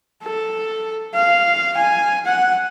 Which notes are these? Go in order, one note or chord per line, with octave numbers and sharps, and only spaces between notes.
A4
F5
G#5
F#5